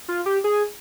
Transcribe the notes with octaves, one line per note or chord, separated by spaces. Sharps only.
F4
G4
G#4